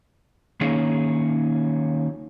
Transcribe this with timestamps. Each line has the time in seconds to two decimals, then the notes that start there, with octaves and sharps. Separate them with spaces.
0.61 D#3 A#3 C#4 D#4 G#4